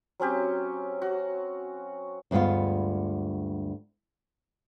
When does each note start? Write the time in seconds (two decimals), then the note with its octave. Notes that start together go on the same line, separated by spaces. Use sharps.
0.20 F#3 C4 C#4 G4
1.02 F#4
2.31 D2 G2 G#3 B3 F4